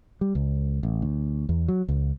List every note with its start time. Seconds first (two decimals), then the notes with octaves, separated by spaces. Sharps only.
0.21 G3
0.35 C#2
0.83 A1
1.02 D2
1.49 E2
1.68 F#3
1.88 C#2